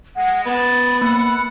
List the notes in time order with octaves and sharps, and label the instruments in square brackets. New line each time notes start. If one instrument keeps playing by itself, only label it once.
[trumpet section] G#3 [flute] F#5
[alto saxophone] B3 [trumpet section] D5 A5 [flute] B5
[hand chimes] A#3 [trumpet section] F#5